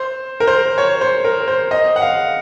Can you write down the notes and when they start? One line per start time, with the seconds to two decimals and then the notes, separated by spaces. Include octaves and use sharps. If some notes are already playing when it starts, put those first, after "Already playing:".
Already playing: C5
0.40 A#4
0.47 C5
0.78 C#5
1.01 C5
1.24 A#4
1.48 C5
1.71 D#5
1.96 F#5
2.02 F5